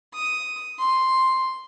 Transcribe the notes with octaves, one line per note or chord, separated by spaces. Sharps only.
D#6
C6